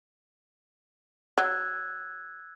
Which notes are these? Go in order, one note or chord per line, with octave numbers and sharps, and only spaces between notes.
F#3 E6 F#6 G#6